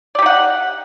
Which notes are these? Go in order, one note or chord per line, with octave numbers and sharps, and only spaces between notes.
D#4 G4 D5 F#5